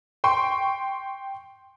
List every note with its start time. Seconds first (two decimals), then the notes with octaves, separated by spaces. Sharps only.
0.24 G5 C6 C#6